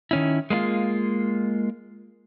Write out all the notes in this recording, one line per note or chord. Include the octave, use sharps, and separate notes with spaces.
D#3 C#4 E4
G#3 A#3 E4 F4